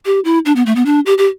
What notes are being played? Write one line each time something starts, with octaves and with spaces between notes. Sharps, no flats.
G4
E4
D4
B3
A3
B3
D4
G4
G4